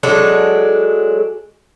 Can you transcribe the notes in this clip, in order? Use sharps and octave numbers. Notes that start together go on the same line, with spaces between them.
F#3 G#3 D4 A4